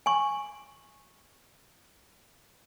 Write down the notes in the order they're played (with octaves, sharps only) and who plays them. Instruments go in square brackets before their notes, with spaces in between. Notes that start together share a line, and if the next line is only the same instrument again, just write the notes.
[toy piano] G#5 C#6